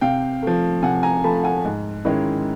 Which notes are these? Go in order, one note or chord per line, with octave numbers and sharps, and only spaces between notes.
C3 F5 G5
F3 A3
C3 F#5 G#5
G#5 A#5
F3 A3 A5 B5
F#5 G#5
G#2
D#3 G#3 C#4 E4